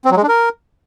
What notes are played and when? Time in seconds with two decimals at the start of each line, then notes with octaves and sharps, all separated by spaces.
0.05 C4
0.11 F#3
0.17 G#3
0.23 D4
0.29 A#4